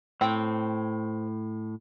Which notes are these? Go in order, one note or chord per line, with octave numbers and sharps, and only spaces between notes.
A2 C4 G5